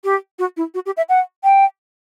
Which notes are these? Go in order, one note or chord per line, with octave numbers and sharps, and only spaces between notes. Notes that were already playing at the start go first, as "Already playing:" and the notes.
G4
F#4
E4
F#4
G4
E5
F#5
G5